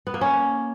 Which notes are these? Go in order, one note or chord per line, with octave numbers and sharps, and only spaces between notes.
B3
A#3
C#4